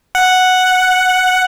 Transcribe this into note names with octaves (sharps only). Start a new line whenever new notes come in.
F#5